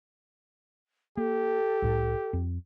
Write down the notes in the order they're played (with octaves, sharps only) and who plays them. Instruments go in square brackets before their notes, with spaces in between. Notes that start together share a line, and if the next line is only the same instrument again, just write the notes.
[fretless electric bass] A#3 [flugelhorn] G4 [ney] A4
[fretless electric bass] C2 A2
F2